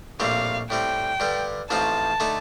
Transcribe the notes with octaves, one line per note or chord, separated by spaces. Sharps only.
A#1 A2 G3 C4 F5
A2 G3 C4 G5
G2 D3 G3
A1 A2 F3 C4 D#4 A5
D3 A3 D#4